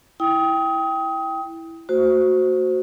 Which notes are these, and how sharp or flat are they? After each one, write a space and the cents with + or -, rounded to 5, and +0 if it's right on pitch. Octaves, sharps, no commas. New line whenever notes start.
E4 +0 G5 +0 D#6 +25
A3 +45 F#4 +0 C5 +0